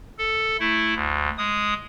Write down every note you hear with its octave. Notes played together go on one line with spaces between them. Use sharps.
A4
A3 E4
D2
G#3 D#6